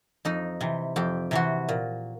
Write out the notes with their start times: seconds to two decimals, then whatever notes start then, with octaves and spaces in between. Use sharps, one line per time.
0.25 F2 D#4
0.61 C3 E3
0.96 F2 G4
1.31 C3 E3 F#4
1.69 A#2